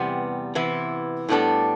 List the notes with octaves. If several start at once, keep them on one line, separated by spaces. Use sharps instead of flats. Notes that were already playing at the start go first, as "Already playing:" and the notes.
Already playing: E2 C3 G3 B3
C3 E3 B3 E4
A2 G3 B3 D4 A4